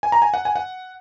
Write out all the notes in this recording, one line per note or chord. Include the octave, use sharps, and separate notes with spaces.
G#5
A#5
G#5
F#5
G#5
F#5